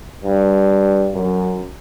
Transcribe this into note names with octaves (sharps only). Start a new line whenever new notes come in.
G2
F#2